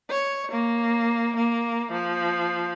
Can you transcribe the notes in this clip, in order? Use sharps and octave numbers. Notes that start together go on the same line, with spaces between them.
C#5
A#3
A#3
F3